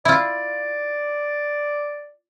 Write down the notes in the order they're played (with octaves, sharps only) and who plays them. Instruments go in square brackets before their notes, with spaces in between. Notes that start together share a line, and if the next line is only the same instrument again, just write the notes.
[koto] E4 F4 [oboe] D5